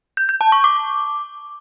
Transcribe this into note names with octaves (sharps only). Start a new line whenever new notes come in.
G6
G6
A5
C#6
D6